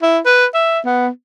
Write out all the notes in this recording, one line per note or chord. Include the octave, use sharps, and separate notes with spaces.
E4
B4
E5
B3